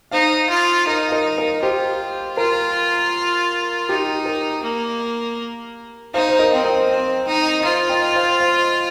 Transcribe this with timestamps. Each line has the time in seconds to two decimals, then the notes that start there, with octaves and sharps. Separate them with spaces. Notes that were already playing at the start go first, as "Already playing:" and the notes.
0.11 D#4 C5 F5
0.49 F4
0.87 D#4 A#4 D#5
1.08 F5
1.12 A#4 D#5
1.38 A#4 D#5
1.62 F4 G4 C5
2.37 F4 A#4
3.89 D#4 G4
4.26 A#4
4.63 A#3
6.14 D#4 C5 F5
6.29 C5
6.39 A#4 D#5
6.52 C4
6.64 A#4 D#5
6.90 C4
7.27 D#4
7.60 D#5
7.64 F4 C5 F5
7.89 D#5 G5
8.15 C5 F5
8.40 C5 F5